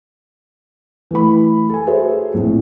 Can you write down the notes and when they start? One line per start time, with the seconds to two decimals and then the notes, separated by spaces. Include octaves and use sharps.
1.11 E3 A3 B5
1.69 A4 G#5
1.87 F#4 G#4 A4 C5 C#5 E5
2.34 A#1 F2 A2